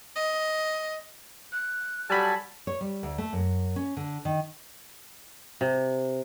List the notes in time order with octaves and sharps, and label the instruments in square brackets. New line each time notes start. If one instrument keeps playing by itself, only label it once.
[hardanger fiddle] D#5
[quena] F#6
[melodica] F#3 A4 G#5 [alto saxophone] G3 [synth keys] A5 B5
[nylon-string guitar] C#5
G3
D2
A3
F#2
C#4
D3
D#3
[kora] C3